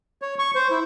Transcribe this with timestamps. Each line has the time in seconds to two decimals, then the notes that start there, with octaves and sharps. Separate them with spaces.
0.22 C#5
0.39 C#6
0.55 C5
0.70 E4